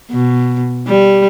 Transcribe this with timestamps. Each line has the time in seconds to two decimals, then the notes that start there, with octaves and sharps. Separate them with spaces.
0.11 B2
0.88 G3